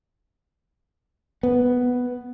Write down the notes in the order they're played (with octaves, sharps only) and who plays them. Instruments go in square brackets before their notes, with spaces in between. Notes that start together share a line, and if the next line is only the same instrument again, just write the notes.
[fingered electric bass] B3